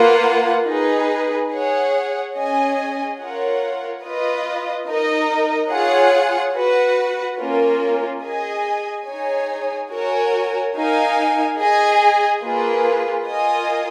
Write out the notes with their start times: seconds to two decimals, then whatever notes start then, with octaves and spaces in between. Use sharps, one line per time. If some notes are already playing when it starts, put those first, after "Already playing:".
Already playing: A#3 F4 B4 F#5
0.68 D#4 G#4 B4
1.52 G#4 C#5 F#5
2.36 C#4 G#4 D#5 G#5
3.19 F4 A#4 C#5 F#5
4.03 F4 B4 D#5
4.88 D#4 A#4 D#5
5.72 F4 G#4 C#5 F#5
6.56 F#4 B4 F#5
7.39 A#3 C#4 F4 A#4
8.23 G#4 D#5 G#5
9.07 D#4 G#4 C#5 G#5
9.91 F#4 A#4 C#5 G#5
10.75 D#4 A#4 F5 G#5
11.59 G#4 D#5 G#5
12.43 A#3 F4 G#4 B4
13.26 F4 A#4 D#5 G#5